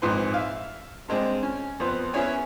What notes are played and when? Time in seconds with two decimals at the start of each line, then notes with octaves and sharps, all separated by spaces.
0.02 A#1 G#2 C4 B4 C6
0.34 E5 F5
1.08 G2 G#3 C4 D4
1.43 C#4
1.80 F2 B3 C5
2.13 B3 C#4 E4 G#4 C#5 G#5